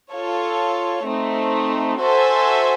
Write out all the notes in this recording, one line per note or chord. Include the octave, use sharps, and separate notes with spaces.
F4 A4 C#5
A3 C4 D#4
F#4 A4 C5 E5 G#5